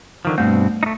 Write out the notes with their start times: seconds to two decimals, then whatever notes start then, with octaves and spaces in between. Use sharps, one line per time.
0.25 D3 D#3 F3
0.38 G2 B2 A3 C4
0.83 A3 D#4